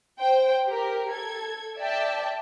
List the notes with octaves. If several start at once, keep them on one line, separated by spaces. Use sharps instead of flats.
C5 G5
G4 A#4
A4 G#6
D5 E5 G5 A5